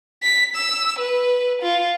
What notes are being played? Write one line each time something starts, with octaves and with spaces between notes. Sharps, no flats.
B6
E6
B4
F4